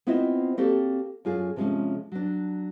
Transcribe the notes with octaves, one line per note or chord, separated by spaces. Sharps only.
B3 C4 E4 F4 C5 D#5
A#3 C4 F#4 G4 A4 D5
F#2 F4 G#4
C3 F3 G3 G#3 C#4
F#3 D4